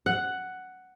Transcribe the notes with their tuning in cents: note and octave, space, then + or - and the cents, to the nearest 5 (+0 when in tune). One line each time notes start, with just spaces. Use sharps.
F#5 +5